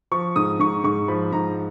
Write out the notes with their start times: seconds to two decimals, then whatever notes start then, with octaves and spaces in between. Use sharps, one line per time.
0.12 F3 C#6
0.36 G#2 D#6
0.60 G#2 C#6
0.84 G#2 C#6
1.08 F3 B5
1.32 G#2 A#5